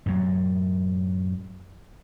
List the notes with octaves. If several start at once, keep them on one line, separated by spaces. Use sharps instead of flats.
F#2 A2 F#3